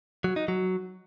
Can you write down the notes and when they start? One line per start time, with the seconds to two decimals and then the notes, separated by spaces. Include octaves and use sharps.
0.24 F#3
0.36 D#4
0.48 F#3